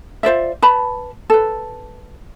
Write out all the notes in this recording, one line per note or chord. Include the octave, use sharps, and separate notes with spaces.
F4 C5 D5 E5
B4 A5 B5
A4 B4